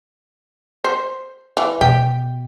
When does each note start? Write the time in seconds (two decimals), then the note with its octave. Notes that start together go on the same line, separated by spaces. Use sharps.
0.84 C5
1.57 E3
1.81 B2 G4